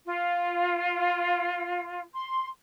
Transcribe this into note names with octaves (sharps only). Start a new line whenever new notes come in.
F4
C6